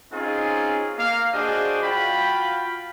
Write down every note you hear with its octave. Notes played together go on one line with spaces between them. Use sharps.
C4 C#4 D#4 F4 G#4
A#3 F5
D4 F#4 G#4 C5 D5 D#5
F4 F#4 F5 G5 B5